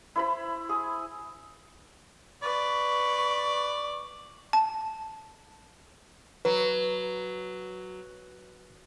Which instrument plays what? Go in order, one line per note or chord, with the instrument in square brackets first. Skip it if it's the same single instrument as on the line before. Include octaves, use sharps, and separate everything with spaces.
[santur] E4 C5 B5
G#4
[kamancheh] B4 [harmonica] D5 [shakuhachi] C#6
[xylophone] A5
[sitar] F#3 [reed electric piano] B4